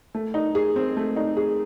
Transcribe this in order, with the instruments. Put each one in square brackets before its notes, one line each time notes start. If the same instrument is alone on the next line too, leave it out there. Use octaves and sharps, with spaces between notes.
[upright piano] A3
D#4
G#4
C4
A3
D#4
G#4